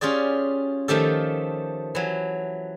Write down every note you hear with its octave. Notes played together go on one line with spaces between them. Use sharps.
C#4 F4 G4 G#4 D5
D#3 F3 A3 G4 A4
E3 F#3